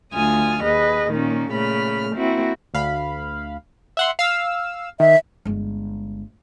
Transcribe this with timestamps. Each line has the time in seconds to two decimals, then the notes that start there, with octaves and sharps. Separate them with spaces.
0.13 D2 F4 G#5 D#6 F6
0.63 D#2 G#4 B4 D#5
1.10 A#2 D#3 A#3 C#4
1.52 A#2 C#3 A3 B5 F6
2.15 A#3 C4 E4 F#4
2.74 D2 F5 B5
3.97 E5 F#5 C6
4.19 F5 E6
5.00 D#3 E5
5.45 G1 G#3